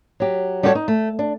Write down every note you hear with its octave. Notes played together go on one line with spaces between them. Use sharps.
F#3 G4
G3 F#4 G4 A4 C#5
D#4
A3
D4